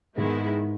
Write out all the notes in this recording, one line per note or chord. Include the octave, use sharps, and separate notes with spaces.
G#2 D#3 G#3 B3 E4